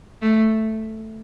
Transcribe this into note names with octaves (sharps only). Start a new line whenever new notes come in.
A3